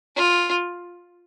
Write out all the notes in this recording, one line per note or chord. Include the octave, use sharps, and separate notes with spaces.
F4